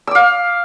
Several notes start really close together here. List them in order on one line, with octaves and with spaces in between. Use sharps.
E6 D6 F5